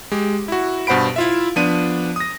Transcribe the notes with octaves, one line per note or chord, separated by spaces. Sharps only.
G#3 G4
E4 F#4
G2 B2 C5 F#5 B5 D7
E4 F4 E5
F3 B3 D4 D#7
D#6 A#6